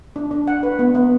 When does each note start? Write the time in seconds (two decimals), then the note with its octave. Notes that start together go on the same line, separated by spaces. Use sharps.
0.16 D4
0.31 D4
0.48 F#5
0.63 B4
0.79 B3
0.95 B3